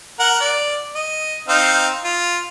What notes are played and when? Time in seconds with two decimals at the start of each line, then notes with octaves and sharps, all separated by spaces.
0.19 A#4 F#5
0.40 D5
0.95 D#5
1.48 C4 D#4 F5
2.04 F4